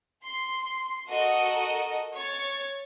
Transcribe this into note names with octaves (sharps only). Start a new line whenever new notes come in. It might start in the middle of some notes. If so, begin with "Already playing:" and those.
C6
F#4 A4 A#4 D#5
C#5 C#6 G#6 A6